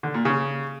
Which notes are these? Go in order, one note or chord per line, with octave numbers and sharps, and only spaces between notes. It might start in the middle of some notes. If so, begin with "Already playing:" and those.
D3
A#2
C#3